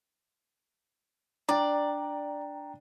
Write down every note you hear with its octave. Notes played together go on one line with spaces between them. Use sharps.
D4 D5 G5 A#5